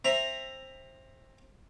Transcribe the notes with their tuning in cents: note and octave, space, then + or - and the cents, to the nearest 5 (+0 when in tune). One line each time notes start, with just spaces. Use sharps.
C4 +20 E5 +10 A#5 +0